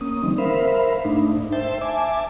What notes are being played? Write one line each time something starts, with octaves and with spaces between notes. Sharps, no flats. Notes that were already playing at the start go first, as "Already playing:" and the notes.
A#3 C#4 D#6
D3 E3 G3 C4 D#4
A#4 C5 E5 F5 B5
G#2 A3 D4 D#4
C5 E5 G5 A5
E5 G#5 A5 D6